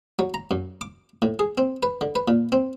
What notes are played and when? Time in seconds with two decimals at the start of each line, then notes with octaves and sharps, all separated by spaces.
0.19 F#3
0.34 A#5
0.51 F#2
0.81 D6
1.22 A2
1.39 G#4
1.58 C4
1.83 B4
2.01 D3
2.15 B4
2.28 A#2
2.52 C4